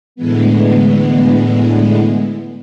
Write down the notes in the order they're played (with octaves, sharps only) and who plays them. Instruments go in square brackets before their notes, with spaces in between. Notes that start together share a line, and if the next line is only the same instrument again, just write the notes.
[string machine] A2 D3 E3 G#3 B3